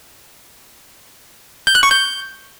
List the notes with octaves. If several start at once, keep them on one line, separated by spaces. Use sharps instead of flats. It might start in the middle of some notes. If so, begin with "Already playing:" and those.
G6
F#6
C#6
G6